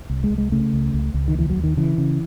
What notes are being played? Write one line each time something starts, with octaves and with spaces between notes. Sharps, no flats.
C2
G#3
C2
G#3
C#3 A3
C#2
C#2
C#2
D#3
D#2 E3
F#3
D#2
D#3
C#3 E3
C#3